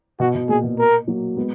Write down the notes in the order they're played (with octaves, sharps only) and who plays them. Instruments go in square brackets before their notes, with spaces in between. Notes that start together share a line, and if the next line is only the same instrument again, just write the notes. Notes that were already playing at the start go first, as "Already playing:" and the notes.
[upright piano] B2 [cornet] F#4
[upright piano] B2
[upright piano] A#2 [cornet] G#4
[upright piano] B2
[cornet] A#4
[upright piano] F#3 A#3
G#3 B3